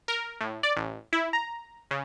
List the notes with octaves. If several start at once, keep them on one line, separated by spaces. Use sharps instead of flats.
A#4
A2
D5
A1
E4
A#5
C#3